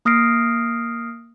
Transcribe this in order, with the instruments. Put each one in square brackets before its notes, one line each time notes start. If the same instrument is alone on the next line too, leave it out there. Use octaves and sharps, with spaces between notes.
[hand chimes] A#3 D#6 F6 A#6 C7 D7